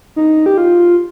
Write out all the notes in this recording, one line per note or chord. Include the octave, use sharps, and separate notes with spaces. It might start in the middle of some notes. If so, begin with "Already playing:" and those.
D#4
G4
F4